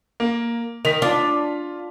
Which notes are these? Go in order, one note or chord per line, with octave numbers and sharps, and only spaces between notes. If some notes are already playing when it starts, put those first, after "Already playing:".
A#3
D#3 B6 F7
D4 F4